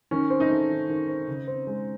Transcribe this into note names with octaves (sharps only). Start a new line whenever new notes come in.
D#3 C#4
C4
D#4
A3
D#3
D#3
C4
C#3
C4
G#3